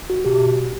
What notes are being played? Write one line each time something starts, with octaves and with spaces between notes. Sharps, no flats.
F#4
B2 G4